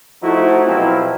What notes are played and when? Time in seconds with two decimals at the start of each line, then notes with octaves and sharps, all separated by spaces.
0.22 F3 A3 D#4 E4 F#4
0.66 B2 F3 F#3 C4 E4 G4